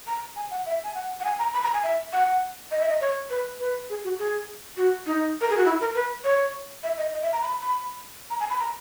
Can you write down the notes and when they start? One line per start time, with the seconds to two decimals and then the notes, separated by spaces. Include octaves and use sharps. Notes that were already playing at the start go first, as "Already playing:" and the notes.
0.07 A#5
0.36 G#5
0.51 F#5
0.66 E5
0.84 G#5
0.95 F#5
1.20 F#5
1.24 G#5
1.39 A#5
1.53 B5
1.63 A#5
1.73 G#5
1.83 E5
2.13 F#5
2.71 D#5
2.80 E5
2.89 D#5
3.01 C#5
3.30 B4
3.60 B4
3.90 G#4
4.04 F#4
4.19 G#4
4.77 F#4
5.06 D#4
5.41 A#4
5.50 G#4
5.57 F#4
5.66 E4
5.80 A#4
5.95 B4
6.24 C#5
6.83 E5
6.98 D#5
7.13 D#5
7.22 E5
7.33 A#5
7.42 B5
7.61 B5
8.30 A#5
8.40 G#5
8.50 B5
8.60 A#5